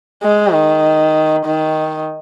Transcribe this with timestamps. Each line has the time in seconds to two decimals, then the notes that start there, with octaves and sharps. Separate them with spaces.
0.23 G#3
0.53 D#3
1.45 D#3